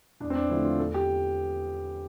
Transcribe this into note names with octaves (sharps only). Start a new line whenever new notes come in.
E2 D4
C4
D4
D3 F3 A3 E4
F4
E2 A4
G4